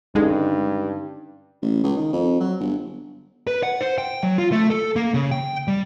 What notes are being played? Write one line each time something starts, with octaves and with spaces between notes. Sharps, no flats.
G2 D3 G#3 C#4 D#4
A1
C#2
D#3
F2
F#3
G1
B4
F#5
C5
G5
F#3
F4
A3
A4
A#3
C#3
G5
G3